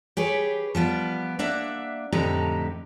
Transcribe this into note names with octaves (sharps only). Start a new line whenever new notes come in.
G4 G#4 B4 C#5
F3 G3 B3
A#3 D4 E5 F#5
F2 A2 D3 D#4 G4 A#5